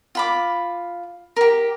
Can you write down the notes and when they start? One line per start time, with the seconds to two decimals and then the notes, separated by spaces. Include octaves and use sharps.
0.15 F4 B5 D6
1.36 G4 A#4